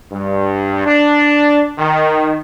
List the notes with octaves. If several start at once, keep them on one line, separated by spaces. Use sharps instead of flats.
G2
D4
D#3